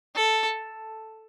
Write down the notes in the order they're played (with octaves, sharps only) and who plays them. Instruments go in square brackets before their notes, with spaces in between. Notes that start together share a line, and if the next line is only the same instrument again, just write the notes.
[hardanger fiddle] A4